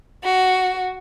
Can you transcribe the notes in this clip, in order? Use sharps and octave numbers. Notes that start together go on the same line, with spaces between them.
F#4